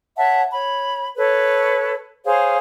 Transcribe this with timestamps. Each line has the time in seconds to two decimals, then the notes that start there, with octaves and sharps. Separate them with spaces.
0.16 C#5 E5 F#5 A5
0.51 C#5 B5
1.16 A4 B4 C#5
2.25 G#4 C5 C#5 F5